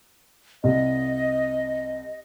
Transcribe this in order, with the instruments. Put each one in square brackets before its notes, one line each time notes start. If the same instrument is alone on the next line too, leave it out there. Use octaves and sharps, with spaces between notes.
[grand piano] C2 [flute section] D#5